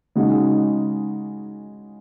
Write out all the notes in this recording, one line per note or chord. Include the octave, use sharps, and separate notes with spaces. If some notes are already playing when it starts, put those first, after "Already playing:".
C#3 G#3 D#4 F#4